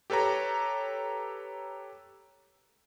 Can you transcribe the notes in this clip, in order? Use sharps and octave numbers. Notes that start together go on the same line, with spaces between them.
G4 A4 B4 C#5 A#5